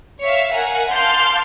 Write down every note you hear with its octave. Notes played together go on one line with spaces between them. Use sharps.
C#5 E5 F5
A#4 F#5 G#5
F5 A5 C6 D6 F6 G6